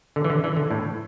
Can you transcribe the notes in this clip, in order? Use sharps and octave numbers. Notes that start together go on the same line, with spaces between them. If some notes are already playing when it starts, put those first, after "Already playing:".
D3
E3
D3
E3
D3
A2